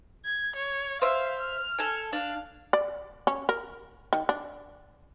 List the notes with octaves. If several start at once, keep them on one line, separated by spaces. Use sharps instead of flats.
G#6
C#5
C5 E5 F5
F6
A4 G#5
D4 F5
D5
C#4
A#4
D#3
D4